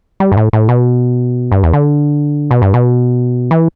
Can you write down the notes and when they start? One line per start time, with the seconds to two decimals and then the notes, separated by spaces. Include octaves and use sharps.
0.20 G3
0.32 G2
0.37 A2
0.53 A2
0.69 B2
1.52 G2
1.63 E2
1.73 D3
2.51 B2
2.62 G2
2.74 B2
3.51 E3